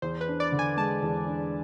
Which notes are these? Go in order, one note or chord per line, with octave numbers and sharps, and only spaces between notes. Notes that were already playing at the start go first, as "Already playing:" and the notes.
E2 C5
B4
D4
D5
D3
G#5
G#3 A5
E2
D4